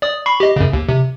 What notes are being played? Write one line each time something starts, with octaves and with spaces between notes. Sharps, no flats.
D5 D#6
B5 C#6 C7
G4 D#5
F#2 C#3
D#2
C3